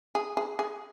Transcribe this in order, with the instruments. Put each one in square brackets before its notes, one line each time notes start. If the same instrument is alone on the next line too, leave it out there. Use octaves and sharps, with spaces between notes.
[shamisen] G#4
G#4
G#4